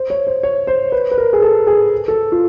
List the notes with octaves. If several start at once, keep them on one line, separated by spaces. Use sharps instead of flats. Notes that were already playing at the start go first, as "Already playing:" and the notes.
Already playing: C5
C#5
C5
C#5
C5
B4
B4
A#4
G#4
A4
G#4
A4
F4